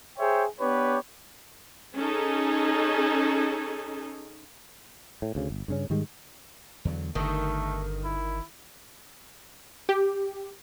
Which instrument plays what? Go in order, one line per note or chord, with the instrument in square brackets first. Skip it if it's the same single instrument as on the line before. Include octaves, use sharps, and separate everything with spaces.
[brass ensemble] G#4 C5 C#5 E5 G5
B3 D4 G4 B4 C#5
[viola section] C#4 D#4 G#4 A4
[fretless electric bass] A2
D2 C#3
G1
G2 C#3 C#4
G#2 D#3 G3 G#3
[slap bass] E2 D3 F#3
[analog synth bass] G1 [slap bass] G2 D3 [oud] D#3 [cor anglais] A3
[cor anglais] E4
[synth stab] G4